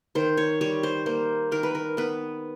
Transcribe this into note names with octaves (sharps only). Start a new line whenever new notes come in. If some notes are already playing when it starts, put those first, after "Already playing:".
D#3 C5
C#5
G3 C#5
C5
A#3 C5
D#3 A#4
B4
A#4
B3 B4